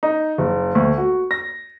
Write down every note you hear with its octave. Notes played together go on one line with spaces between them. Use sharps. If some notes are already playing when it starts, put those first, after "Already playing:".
D#4
F#1
D2
F#4
A#6